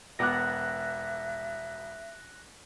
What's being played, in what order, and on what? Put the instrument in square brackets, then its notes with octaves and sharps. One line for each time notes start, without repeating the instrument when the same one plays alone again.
[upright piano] E1 B3 D6 [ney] E5 [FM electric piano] F#6 A#6